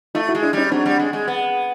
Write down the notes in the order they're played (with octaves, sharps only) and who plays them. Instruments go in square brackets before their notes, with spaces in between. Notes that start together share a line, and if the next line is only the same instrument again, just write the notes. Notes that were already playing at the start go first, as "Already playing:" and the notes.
[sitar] A3 [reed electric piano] D#4 F4
[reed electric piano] E4 F#4
[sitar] G#3
[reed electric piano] D4 E4
[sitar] G3 [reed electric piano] C#4 D#4
[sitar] F#3 [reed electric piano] C4 D4
[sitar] G3
G#3
G#3
B3